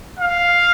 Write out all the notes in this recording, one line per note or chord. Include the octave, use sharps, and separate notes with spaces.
F5